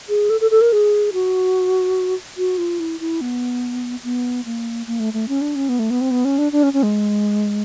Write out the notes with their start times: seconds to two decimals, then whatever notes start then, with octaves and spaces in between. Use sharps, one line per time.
0.09 G#4
0.30 A4
0.41 A4
0.51 A4
0.61 A#4
0.73 G#4
1.13 F#4
2.38 F#4
2.58 F4
2.80 E4
3.00 E4
3.21 B3
4.04 B3
4.45 A#3
4.87 A#3
5.00 A3
5.13 A3
5.28 C#4
5.41 D4
5.55 C#4
5.69 B3
5.79 A3
5.90 B3
6.01 C4
6.11 B3
6.25 C#4
6.38 D4
6.52 D4
6.63 C#4
6.73 C#4
6.83 G#3